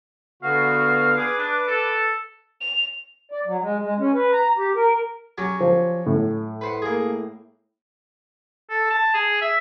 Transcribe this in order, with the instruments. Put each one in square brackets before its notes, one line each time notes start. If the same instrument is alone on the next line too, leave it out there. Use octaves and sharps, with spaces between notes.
[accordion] D3 B3 F#4 [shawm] F5
[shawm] G#4 [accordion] B4 D6
[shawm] D4
A4
[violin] F7
[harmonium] D5
F#3
G#3
G#3
C#4
B4
A#5
G4
A#4
[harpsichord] F#3 C#4 G4
[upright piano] F3 C5
A2
[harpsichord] B4 C5 F#5
A#3 G#4
[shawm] A4
A5
G#4
E5